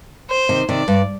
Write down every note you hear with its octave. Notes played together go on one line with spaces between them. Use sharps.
C5
C3 D#3
C3 D#3 D5
G2